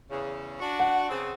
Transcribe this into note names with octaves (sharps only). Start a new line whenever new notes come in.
E2 C#3
D4 F#4
F#5
C#3 B3 C4